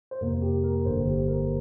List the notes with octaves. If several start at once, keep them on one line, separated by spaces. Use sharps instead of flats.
C5
F2 C3 A#3 A#4
G4
A#4
G1 G2 D3 A#3 C5
G4
A#4